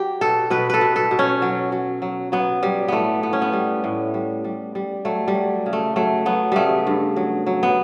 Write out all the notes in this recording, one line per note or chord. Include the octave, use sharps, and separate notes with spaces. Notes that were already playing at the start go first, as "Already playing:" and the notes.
Already playing: F#3 G4
B2 A4
B2 B4
A4 B4
B2
A4
B2
C#4
F#3
F#3
F#3
F#3 B3
F#3 G3
A2 A3 B3
A2 B3
C#4
B3
G3
A2
G3
G3
G3
F#3 A3
G3
F#3
C#3
A3
F#3 A3
F#3 B3
C#3 G3 A3
G2
F#3
F#3
B3